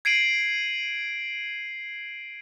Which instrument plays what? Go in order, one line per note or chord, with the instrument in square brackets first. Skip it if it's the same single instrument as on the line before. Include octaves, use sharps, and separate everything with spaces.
[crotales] G#6 C7 D7 D#7 F#7